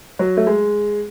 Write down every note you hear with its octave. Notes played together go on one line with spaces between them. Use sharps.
F#3
A3
G#3